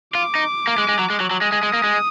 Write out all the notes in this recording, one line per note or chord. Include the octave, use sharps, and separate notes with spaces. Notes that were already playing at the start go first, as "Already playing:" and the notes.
F4 D6
D#4
A#3
G#3
G#3
F#3
G#3
F#3
F#3
G#3 D#6
G#3
G#3
A#3
G#3